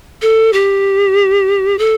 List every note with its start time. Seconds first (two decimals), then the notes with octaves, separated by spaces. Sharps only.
0.22 A4
0.53 G4
1.79 A4